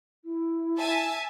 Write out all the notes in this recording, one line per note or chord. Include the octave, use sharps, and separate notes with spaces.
E4
E5 G#5 A5